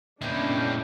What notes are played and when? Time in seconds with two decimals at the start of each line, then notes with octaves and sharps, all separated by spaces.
0.22 A#2 G#3 A3 B3 C#4 D4 E4 G5